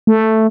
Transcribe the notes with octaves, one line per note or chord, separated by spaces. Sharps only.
A3